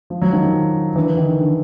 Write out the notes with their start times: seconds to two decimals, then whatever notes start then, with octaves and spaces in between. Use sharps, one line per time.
0.10 F3
0.22 F#3
0.33 D#3 F3
0.96 D3 E3
1.17 D#3
1.39 D3